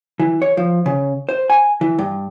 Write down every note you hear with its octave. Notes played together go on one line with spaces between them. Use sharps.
E3
C#5
F3
C#3
C5
G#5
E3
G2